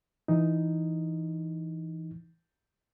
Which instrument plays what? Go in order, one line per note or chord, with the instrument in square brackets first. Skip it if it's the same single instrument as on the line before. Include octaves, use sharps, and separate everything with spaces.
[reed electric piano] E3 D#4